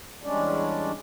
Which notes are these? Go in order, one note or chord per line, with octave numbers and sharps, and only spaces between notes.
E2 G3 G#3 C#4 D4 D5